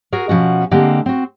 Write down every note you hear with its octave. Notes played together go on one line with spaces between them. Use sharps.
F#4 G#4 A#4
B2 F3 C#4 F#4
D3 G#3 A#3 C4 G4
C4 F#4